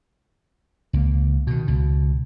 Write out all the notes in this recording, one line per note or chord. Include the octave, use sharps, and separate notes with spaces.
C#2 A#3
B2 D#3
C#2 B2